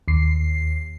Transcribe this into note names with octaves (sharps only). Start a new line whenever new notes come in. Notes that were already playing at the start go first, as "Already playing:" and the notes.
D#2 C7